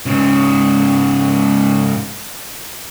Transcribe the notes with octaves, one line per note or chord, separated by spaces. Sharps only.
G#2 C#3